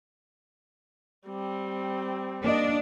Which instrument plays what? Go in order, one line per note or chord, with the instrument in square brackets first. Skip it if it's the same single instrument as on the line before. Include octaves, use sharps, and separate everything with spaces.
[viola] G3 C4
[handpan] A#3 D#5 [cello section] D4